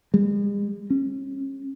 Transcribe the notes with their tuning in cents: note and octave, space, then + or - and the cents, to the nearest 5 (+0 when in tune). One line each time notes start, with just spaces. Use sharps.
G#3 -45
C#4 -35